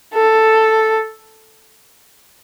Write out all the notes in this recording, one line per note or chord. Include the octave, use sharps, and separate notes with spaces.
A4